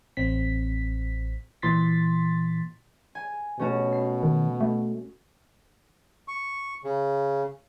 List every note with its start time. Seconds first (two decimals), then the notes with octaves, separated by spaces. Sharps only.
0.17 A1 C4 B6
1.62 A#2 E3 C6 A6 B6
3.15 G#5
3.59 B2 A3 C#4 F#4
3.93 C7
4.23 D#3
4.61 A3
6.28 C#6
6.84 C#3